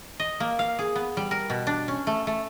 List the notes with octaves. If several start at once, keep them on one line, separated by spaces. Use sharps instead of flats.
D#5
A#3
F5
G#4
B3
G3
A#4
B2
D4
C#4
A3
A3